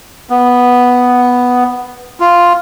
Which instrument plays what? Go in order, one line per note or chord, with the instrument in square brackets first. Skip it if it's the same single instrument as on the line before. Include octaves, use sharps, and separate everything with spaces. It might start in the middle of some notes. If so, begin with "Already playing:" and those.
[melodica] B3
F4